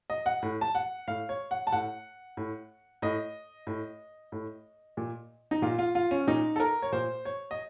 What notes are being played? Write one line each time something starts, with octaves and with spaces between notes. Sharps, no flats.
D#5
F#5
A2
A5
F#5
A2 F5
C#5
F#5
A5
A2 F#5
A2
A2 D#5
A2
A2
A#2
D#4
A#2 F4
F4
F4
C#4
A#2 D#4
A4
A#4
C#5
A#2 C5
C#5
D#5